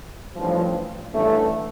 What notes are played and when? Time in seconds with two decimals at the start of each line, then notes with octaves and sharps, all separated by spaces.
0.36 A1 G2 F3
1.12 A1 G2 D3 A3